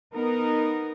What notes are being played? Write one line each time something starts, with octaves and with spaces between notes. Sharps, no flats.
B3 D#4 A#4